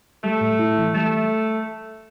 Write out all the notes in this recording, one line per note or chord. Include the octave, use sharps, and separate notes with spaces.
G3 A3
A2
E4
E3
G3 A3